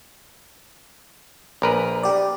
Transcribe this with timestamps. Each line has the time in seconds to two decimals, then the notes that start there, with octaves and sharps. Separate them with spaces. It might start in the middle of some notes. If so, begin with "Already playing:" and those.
1.62 A#1 A#4 B4
2.03 G4 D5